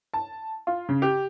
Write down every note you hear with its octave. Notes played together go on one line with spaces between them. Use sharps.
A5
F4
C#3
G4